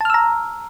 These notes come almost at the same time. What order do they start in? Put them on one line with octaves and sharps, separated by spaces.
A5 F6 E6 A#5